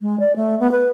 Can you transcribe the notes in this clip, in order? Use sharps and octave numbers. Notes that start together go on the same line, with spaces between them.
G#3
D5
A3
B3
B4